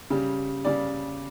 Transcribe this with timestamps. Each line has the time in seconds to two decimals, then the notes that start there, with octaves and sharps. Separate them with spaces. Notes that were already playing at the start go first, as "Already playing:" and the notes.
0.10 C#3 G3
0.65 C#3 G3 D5